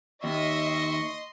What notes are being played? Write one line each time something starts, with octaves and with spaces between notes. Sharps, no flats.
D#2 D#5 E5 C6 C#6